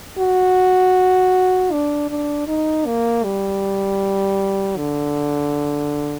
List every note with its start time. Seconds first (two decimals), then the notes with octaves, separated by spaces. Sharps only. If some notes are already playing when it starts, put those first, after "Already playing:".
0.19 F#4
1.72 D4
2.10 D4
2.47 D#4
2.86 A#3
3.24 G3
4.77 D3